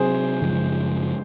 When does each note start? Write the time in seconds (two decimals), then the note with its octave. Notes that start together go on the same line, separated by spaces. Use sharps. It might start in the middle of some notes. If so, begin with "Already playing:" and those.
Already playing: C3 F#3 C4 G#4 C5
0.41 F#2 C#3 F3 G#3